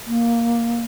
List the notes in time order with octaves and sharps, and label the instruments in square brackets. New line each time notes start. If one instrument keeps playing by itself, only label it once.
[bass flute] A#3